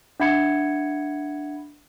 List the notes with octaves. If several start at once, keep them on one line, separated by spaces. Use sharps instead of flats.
D4 E5 F#5 B5 G#6 C#7